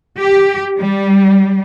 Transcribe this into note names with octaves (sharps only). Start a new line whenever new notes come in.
G4
G3